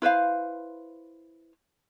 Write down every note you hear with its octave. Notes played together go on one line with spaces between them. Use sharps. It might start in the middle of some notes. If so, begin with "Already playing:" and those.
E4 B4 C5 F5